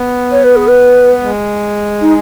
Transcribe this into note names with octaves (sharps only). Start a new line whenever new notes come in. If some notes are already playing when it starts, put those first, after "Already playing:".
Already playing: B3
C#5
B4
G#4
B4
G#3
D#4